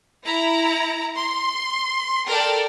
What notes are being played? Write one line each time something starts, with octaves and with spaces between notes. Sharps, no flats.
E4 A#5
C6
A4 A#4 D5 G5